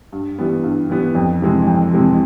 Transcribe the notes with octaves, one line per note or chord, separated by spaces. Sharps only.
G2
E3 G3 B3
G2
E3 G3 B3
F2
C3 E3 G#3 C4
F2
C3 E3 G#3 C4